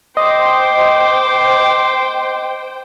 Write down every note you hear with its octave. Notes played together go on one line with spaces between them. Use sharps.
C5 D#5 G5 C6 D6